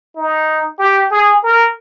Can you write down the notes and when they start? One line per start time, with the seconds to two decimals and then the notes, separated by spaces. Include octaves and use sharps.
0.16 D#4
0.79 G4
1.11 G#4
1.43 A#4